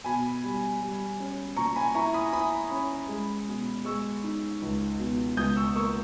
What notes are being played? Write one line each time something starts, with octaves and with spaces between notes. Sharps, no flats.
B2 G#5 B5
G3
G3
C#4
A#2 A#5 C#6
G#5 B5
E4 A#5 C#6
B5 D#6
E4 B5 D#6
C#4
G#3
B2
G#3 C#6 E6
D#4
C#2
B2
C#2 D#6 G6
C#6 E6
A#3 C#6 E6